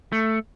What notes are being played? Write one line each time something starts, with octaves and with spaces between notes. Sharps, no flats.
A3